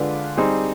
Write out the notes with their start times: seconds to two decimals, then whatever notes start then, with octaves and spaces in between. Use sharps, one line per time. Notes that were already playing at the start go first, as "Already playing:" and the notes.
Already playing: D3 G#3 D4 F4 B4
0.37 G3 C4 D#4 G#4